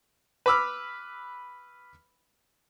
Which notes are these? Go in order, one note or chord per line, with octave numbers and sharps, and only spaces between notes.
B4 B5 D6 E6 F6